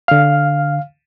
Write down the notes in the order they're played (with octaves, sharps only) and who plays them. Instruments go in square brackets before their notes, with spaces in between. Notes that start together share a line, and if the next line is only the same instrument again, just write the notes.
[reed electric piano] D3 F6 [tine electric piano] F5